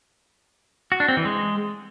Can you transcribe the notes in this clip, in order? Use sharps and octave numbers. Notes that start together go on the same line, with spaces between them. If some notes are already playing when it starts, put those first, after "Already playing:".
F#4
D4
C4
E3
G#3